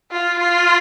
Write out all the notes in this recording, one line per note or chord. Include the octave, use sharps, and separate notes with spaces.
F4
F4